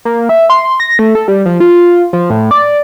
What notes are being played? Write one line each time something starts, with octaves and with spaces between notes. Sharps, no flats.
A#3
E5
C6
A#6
A3
A4
G3
F3
F4
F3
A2
D5